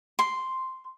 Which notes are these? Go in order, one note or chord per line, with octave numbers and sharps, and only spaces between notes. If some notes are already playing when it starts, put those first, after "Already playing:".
C6